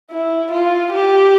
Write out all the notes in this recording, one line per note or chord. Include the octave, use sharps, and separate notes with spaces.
E4
F4
G4